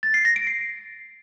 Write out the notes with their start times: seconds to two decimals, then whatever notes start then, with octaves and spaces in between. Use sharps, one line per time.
0.03 A6
0.14 C7
0.25 A#6
0.36 D7
0.47 C7